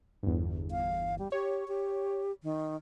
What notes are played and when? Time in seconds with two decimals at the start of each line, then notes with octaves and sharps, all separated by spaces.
0.23 G1 E2
0.71 F5
1.19 G3
1.32 G4 C#5
1.68 G4
2.43 D#3